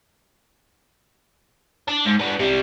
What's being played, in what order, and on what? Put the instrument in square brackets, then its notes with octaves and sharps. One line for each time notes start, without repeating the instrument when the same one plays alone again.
[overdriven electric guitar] D4
G#2
B3 D4
C3 G3